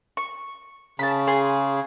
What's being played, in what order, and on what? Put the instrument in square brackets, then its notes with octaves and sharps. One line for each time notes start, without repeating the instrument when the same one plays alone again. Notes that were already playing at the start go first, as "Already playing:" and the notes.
[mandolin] C#6
[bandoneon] C#3 [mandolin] A5 B5
[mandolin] G#4 C6